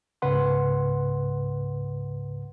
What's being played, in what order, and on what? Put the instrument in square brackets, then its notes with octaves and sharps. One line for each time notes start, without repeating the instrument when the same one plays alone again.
[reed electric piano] C#2 G#2 C#3 B4 F#5 C6